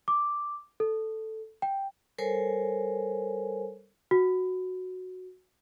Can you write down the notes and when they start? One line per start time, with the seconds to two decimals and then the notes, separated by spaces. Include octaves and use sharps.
0.08 D6
0.80 A4
1.62 G5
2.18 G3 A4 A#4 C5 C#5 G#5
4.11 F#4